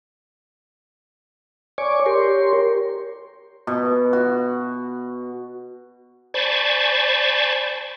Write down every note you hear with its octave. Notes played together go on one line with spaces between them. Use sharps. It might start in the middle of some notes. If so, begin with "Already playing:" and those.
C#5 D5 G#5 C#6 D6
G4 A#4 C#5 C6
B2
F#4
C5 D5 G#5 A5 B5 C#6